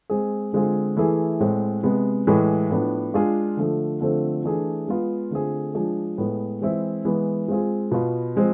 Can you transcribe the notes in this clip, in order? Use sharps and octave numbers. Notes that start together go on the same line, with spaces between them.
G#3 C4 G#4
D3 G#3 C4 F4 G#4
E3 A3 E4 G#4
A2 G#3 C4
C3 G#3 B3
A2 E3 G#3
A2 F3 B3 D4
G#3 D4 F4 G#4
D3 F3 A3
D3 F3 A3 C4
E3 A3 D4 G#4
G#3 B3 F4
D3 A3 C4 F4 G#4
F3 G#3 D4 G#4
A2 G#3 B3
E3 G#3 C4 E4
E3 G#3 B3
G#3 C4 F4 G#4
B2 B3 F4
F3 G#3 C4